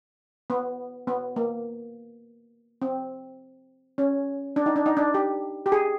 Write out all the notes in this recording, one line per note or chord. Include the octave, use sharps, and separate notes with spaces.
B3
B3
A#3
C4
C#4
D4
D#4
D4
D#4
D4
G4
G4
G#4